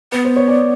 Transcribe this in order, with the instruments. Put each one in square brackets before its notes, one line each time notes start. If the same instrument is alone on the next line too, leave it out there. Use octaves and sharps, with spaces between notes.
[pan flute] B3 [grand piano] B4
[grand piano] C5
C#5
D5